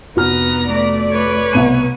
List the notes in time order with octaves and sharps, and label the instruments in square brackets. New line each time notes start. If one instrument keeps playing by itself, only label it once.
[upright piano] F1 F#4 F6 [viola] B3 A#5
[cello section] A3 D5
[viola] B4 C#5
[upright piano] C2 B2 D#7